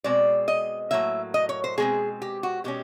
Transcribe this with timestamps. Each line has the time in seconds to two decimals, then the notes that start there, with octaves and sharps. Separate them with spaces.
0.04 B2 G#3 C4 D5
0.48 D#5
0.91 A2 F#3 A#3 E5
1.34 D#5
1.49 C#5
1.64 C5
1.78 B2 G#3 C4 G#4
2.22 G4
2.43 F#4
2.64 B2 G#3 C#4 G4